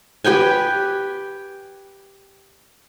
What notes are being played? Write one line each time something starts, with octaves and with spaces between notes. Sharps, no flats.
G4 B4 G5 G#5